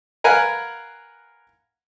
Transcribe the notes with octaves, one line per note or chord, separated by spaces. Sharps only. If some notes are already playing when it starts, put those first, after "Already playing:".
A#4 B4 F5 F#5 G#5